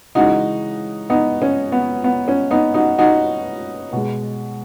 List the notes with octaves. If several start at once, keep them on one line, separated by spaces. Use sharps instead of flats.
C#3 E3 G#3 D#4 F#4
B3 D#4
C#4
B3
B3
C#4
B3 D#4
D#4 F#4
D#4 F#4
B2 G#3